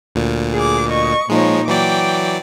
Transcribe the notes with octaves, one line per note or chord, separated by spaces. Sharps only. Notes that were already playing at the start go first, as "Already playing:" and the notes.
D2 A#2
G#4 D6
D#5 C#6
A#2 F3 G#3 D#4 C#5
E3 F#3 D5 G5 D6